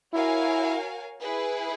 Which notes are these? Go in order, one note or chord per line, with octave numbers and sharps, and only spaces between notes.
E4 F#4 A#4 C#5 F5 G#5
E4 G#4 B4